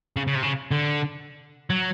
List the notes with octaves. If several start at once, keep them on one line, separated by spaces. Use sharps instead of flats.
C#3
C#3
C3
C#3
D3
F#3